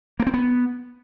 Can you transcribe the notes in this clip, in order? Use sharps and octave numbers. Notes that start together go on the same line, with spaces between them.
A#3
C4
B3